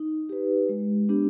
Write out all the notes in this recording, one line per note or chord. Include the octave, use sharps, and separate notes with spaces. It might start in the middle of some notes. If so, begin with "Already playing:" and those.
Already playing: D#4
G4 B4
G#3
B3 D4 G4